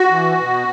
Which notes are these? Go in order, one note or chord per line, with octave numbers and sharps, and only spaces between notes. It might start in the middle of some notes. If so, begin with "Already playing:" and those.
Already playing: F#4
E3
B2